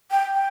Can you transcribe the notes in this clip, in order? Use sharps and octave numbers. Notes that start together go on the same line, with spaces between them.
G5
G5